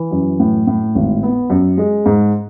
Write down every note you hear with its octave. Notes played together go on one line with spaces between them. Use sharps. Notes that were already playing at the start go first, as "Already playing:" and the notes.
Already playing: E3
F#2
A2
A2
G#1
B3
F#2
G#3
G#2